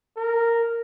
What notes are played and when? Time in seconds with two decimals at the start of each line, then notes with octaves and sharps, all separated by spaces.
0.17 A#4